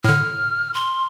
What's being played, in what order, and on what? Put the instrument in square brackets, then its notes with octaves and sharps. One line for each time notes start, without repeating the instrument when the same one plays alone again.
[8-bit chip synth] A2 D3 [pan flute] F6
[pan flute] C6